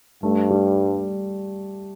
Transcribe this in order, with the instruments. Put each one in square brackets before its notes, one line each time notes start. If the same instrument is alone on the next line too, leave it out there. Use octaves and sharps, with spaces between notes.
[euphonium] G2 [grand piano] A3
[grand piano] G3